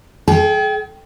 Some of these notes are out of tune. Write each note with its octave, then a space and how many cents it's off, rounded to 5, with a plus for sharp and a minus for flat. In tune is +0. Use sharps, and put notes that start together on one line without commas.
G#4 +40 G5 -10